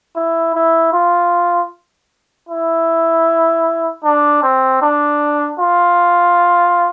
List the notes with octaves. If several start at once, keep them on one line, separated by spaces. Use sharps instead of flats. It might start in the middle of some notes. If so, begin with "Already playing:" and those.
E4
E4
F4
E4
D4
C4
D4
F4